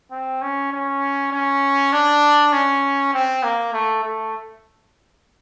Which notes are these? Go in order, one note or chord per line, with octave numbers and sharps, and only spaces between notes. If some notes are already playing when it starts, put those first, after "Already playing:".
C4
C#4
C#4
C#4
D4
C#4
C4
A#3
A3
A3